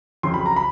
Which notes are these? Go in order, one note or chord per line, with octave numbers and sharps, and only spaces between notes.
F2 C#3 F#3 C6
B5
A#5
B5